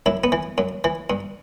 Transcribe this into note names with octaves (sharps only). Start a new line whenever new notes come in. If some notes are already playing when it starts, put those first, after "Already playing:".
F#2 E4
B3
E3
F#2
E3
G2